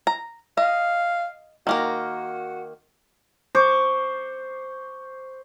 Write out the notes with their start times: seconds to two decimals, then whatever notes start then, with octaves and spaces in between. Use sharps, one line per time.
0.07 A#5
0.57 D#5 F5
1.67 D#3 A#3 F#4 A#4
3.55 C5 C#6 D6